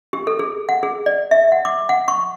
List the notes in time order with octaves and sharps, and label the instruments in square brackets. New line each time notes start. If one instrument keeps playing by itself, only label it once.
[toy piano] G4
A4
G#4
F#5
G#4
D5
E5
F#5
D6
F#5
C#6